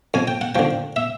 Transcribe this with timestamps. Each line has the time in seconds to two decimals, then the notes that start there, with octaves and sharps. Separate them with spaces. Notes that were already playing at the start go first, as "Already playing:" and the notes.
0.14 F2 G#5
0.28 G5
0.41 F#5
0.55 D3 F3 G5
0.96 E5